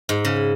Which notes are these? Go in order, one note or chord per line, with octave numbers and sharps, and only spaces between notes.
G#2
C#3